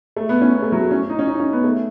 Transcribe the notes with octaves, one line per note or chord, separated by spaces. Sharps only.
A3
B3
C#4
B3
A3
F#3
A3
C#4
D#4
C#4
D#4
C#4
B3
A3